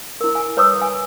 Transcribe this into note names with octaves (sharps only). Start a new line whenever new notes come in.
E4 A#4
G#5
B4 C#5 A#5 C#6 D#6 E6
G#5